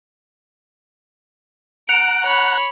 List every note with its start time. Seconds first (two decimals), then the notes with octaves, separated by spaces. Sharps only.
1.89 F#5 A#5 F#6 D7
2.23 C#5 B5